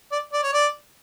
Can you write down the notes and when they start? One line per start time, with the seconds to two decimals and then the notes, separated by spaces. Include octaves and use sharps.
0.12 D5
0.33 D5
0.43 C#5
0.53 D5